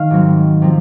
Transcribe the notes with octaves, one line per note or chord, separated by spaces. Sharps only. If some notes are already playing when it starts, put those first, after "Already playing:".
Already playing: D#3 F5
G#2 F#3 C4
C3 F3